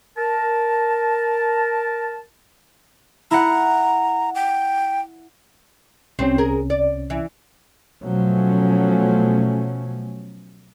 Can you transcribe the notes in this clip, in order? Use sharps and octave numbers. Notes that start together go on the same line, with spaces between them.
A#4 A5
E4 F#5 A#5
G5
C2 C3 C4 C#4
G#4 A#4
D5
E3
B2 F3 F#3 A3 C#4